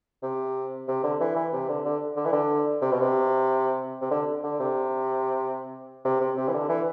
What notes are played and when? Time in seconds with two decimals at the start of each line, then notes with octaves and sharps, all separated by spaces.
0.23 C3
0.88 C3
1.04 D3
1.20 E3
1.36 E3
1.53 C3
1.69 D3
1.85 D3
2.17 D3
2.25 E3
2.32 D3
2.82 C3
2.92 B2
3.00 C3
4.01 C3
4.11 D3
4.44 D3
4.60 C3
6.05 C3
6.20 C3
6.37 C3
6.48 E3
6.54 D3
6.69 E3